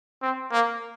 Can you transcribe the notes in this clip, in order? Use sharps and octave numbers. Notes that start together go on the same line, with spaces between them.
C4
A#3